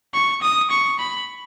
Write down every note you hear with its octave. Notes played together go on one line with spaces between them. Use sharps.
C#6
D#6
C#6
B5